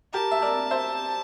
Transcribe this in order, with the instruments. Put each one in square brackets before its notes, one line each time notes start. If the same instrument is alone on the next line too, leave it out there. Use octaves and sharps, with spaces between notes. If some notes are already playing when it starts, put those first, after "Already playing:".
[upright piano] G4 A#4 [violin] A5
[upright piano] E5
A#4 D5
C5 E5